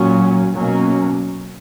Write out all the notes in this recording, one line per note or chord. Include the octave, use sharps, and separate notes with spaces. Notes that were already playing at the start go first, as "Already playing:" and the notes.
Already playing: A#2 F#3 C#4
B2 F#3 A#3 C#4